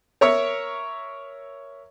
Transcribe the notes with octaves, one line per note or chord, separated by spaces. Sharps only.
A#4 C#5 E5 C#6